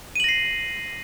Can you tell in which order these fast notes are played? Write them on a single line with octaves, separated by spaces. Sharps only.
D#7 F#7 A#6 C7